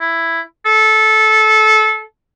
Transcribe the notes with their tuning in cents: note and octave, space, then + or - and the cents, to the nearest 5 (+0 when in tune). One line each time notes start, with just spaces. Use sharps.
E4 +5
A4 -20